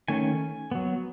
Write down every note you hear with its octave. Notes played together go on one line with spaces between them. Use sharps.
D#3 A3 C#4 G#5
F#3 B3